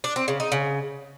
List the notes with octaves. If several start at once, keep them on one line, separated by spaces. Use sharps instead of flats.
D4
C4
C#3
D#4
C#3